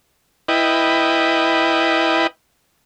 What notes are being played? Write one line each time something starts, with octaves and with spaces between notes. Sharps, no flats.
E4 B4 D#5 G5